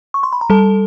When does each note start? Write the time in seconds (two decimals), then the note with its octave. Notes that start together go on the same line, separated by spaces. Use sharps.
0.14 C#6
0.23 C6
0.33 B5
0.41 A#5
0.50 G3 A4 A5